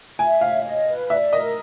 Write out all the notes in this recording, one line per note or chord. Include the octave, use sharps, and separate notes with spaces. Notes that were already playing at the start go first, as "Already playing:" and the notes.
E5 G#5
C#5 F5
D#5
B4
D5 E5
A#4 D#5